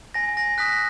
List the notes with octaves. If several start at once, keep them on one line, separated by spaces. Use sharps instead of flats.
G#5 A#6
A#6
D#6 F#6 B6